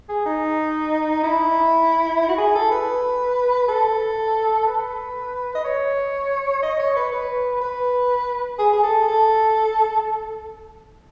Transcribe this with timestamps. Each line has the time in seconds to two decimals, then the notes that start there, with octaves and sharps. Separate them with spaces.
0.09 G#4
0.26 D#4
1.23 E4
2.29 F#4
2.38 G#4
2.55 A4
2.71 B4
3.69 A4
4.67 B4
5.55 D#5
5.64 C#5
6.63 D#5
6.79 C#5
6.96 B4
7.12 B4
7.61 B4
8.59 G#4
8.73 G#4
8.83 A4
9.08 A4